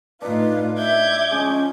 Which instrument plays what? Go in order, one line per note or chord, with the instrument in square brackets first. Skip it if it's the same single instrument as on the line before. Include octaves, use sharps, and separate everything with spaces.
[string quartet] A2 F4 [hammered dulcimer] D4 D#4 [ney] B4
[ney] E5 [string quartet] D6 G6 G#6
[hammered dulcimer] F3 G#3 [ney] C#4